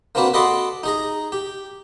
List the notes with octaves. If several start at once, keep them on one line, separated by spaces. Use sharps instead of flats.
A#3 C4 D4 F#4 B4
F#4 A4 D#5 B5 C6 D6
D#4 G#4 A#5
G4